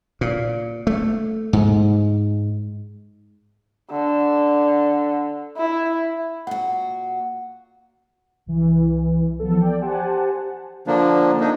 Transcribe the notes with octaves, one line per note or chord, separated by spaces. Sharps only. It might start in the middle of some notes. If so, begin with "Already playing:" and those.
A#2
A3
G#2
D3
E4
A#2 F#4 F#5
C2 E3
E3 F3 B3 A4
D5 G5
G4 C5 F#5 G#5 A5
D3 F3 A#3 D4
A#3 D4 D#4